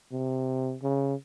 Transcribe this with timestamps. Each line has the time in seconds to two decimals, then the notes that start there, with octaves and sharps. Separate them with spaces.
0.12 C3
0.83 C#3